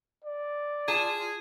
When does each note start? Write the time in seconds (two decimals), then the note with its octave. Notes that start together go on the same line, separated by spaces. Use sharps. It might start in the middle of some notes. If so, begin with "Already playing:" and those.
0.24 D5
0.88 F4 G#4 A5